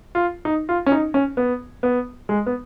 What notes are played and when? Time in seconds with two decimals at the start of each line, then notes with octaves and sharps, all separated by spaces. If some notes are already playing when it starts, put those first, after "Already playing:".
0.15 F4
0.45 D#4
0.69 F4
0.86 C#4
0.92 D#4
1.14 C#4
1.37 B3
1.83 B3
2.29 G#3
2.46 B3